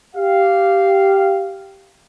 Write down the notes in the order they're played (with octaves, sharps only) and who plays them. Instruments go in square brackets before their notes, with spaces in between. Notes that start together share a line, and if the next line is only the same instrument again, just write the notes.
[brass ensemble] G4 F5